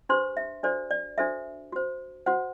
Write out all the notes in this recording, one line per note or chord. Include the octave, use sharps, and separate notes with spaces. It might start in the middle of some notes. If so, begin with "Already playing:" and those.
D4 G4 B4 C5 C6
E5
D4 F#4 A4 C5 D5
D5
D4 F#4 A4 C5 E5
F#4 C5
F#4 C5 F#5